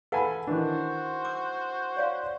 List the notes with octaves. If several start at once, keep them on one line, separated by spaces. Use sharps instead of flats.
A4 B4 F5 F#5 G#5 B5
D#3 E3 D4 F#4 C5
D6 E6
C#5 D5 F5